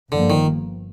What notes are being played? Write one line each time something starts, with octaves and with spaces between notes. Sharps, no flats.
G1 G2 D3 F3 A#3
D#3